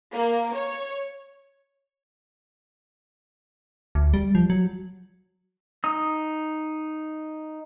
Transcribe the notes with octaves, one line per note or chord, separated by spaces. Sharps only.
A#3
C#5
D2
G3
F3
F#3
D#4 D#6